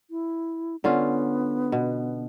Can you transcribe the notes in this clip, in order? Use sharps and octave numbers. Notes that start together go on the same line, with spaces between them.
E4
D3 B3 C#4 F4
B2